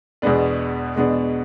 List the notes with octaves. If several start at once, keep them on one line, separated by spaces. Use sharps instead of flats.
E2 B2 G#3 B3 D4
E2 B2 G#3 B3 D4